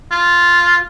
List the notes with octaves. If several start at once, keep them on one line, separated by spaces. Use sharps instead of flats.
F4